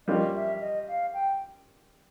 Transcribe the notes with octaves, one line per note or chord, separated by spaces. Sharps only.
G3 A#3 C#4 F4 D#5
E5
D#5
F5
G5